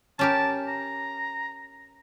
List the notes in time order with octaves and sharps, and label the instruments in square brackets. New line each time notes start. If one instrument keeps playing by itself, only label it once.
[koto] C#4 G4 A#4 [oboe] A5
[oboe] A#5